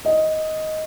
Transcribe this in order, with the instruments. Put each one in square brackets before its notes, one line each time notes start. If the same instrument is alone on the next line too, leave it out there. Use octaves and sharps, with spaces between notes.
[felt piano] D#5